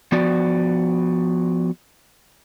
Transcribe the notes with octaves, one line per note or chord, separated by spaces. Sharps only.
F3 B3 F#4 D5